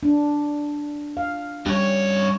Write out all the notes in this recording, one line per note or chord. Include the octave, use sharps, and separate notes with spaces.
D4
F5
G2 G3 C#4 G4 C#5